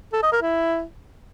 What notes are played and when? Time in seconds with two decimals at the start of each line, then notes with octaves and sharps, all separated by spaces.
0.13 A4
0.23 D#5
0.32 A#4
0.42 E4